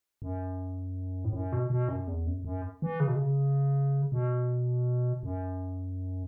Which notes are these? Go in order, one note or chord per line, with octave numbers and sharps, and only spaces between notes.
F#2
A2
F#2
B2
B2
F#2
E2
F#2
F#2
E3
C#3
B2
C#3
B2
F#2